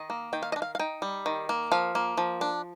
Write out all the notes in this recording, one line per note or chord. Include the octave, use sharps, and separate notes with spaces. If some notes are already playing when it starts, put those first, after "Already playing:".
Already playing: D#3 D#5
A#3
D#3 G5
F5
D#5
D4
F5
F5
D#4 G5
G3
D#3
A#3
F3 F5
A#3
F3
D4